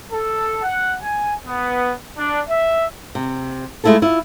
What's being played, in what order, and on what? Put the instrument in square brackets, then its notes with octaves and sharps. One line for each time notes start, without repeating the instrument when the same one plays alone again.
[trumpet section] A4
F#5
G#5
B3
D4
E5
[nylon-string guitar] C3
G#3 A3 C#4 E4 F4 A4
E4 F4